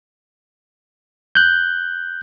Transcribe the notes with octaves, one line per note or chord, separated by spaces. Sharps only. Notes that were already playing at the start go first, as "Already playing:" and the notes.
F#6 G6